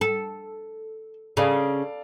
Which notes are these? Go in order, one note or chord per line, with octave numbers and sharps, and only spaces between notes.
A4
C#3 A4 D5 F5